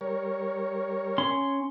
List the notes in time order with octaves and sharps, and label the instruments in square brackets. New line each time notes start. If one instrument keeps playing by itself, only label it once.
[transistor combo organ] G3 A#4 C#5
[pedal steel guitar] C#4 C6